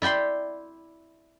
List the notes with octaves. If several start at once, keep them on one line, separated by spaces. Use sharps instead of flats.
E4 D5 G5 B5 C6